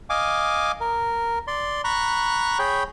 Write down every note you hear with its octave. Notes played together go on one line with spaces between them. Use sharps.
D#5 F5 G#5 D6
A#4
D5 C6
A#5 B5 C#6 F#6
G#4 C#5 G5 B5